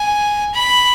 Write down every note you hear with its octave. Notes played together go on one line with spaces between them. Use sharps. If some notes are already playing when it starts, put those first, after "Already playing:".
Already playing: G#5
B5